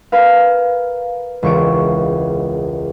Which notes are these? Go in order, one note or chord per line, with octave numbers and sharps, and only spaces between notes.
A#4 B4 F5
E1 C#2 C#6 C#7 D7